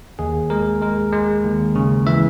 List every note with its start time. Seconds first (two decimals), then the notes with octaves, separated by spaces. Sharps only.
0.19 D#2 G#4
0.50 G#3 A#4
0.82 G#3 A#4
1.12 G#3
1.44 D#2
1.75 C#3
2.07 E3 E5